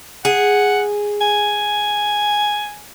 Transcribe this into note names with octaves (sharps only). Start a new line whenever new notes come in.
G#4 F#5
G#5